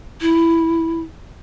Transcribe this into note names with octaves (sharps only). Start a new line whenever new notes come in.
E4